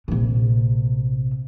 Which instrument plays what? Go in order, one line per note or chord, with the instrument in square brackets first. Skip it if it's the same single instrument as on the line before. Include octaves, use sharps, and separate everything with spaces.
[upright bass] A#1 C3